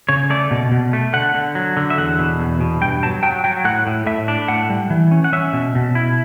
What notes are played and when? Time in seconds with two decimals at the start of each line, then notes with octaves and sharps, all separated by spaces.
0.09 C#3 C#5
0.30 A3 D5
0.51 B2
0.72 B2
0.93 A3
1.13 D3 F#5
1.35 D3
1.55 F#3
1.77 D3
1.90 E5
1.98 E2 F#5
2.19 B2
2.40 E2
2.61 B2
2.81 G2 G5
3.03 F#3 A5
3.23 F#3 G5
3.44 F#3 G5
3.65 A2 F#5
3.87 A2
4.06 A2 E5
4.28 D4
4.48 A2 F#5
4.70 G3
4.90 E3
5.11 C#4
5.24 F#5
5.33 C#4 E5
5.53 B2
5.75 B2
5.95 E4